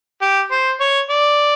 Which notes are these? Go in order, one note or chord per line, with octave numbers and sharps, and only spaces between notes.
G4
C5
C#5
D5